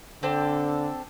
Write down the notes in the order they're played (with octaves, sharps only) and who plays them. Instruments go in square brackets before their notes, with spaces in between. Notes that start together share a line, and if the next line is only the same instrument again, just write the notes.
[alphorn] D3 [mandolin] C4 D4 A4